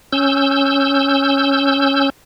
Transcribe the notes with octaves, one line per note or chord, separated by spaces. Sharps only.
C#4 E6 G6